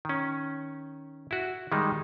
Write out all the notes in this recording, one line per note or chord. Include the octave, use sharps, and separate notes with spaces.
D#3 C#4
E4 F#4
D#3 G3 G#3 D#4